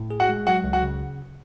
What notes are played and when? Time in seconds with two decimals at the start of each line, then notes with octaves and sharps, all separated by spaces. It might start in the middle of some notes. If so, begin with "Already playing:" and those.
Already playing: A2
0.10 G#4
0.20 F#4 F#5
0.29 G#3
0.47 F#3 F#4 F#5
0.64 C#2
0.73 F#4 F#5
0.83 C#3